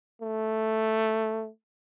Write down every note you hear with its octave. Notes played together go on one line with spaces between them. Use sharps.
A3